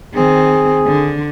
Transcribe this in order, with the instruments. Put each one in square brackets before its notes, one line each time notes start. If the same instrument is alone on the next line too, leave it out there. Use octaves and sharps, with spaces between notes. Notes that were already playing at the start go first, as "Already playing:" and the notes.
[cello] D#3 C4 [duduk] G#4
[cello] D3